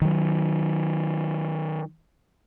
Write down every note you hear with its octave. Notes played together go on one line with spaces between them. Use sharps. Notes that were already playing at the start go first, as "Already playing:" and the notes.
D#3 F#3